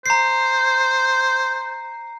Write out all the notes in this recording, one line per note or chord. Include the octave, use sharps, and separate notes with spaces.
C5 A#5 C7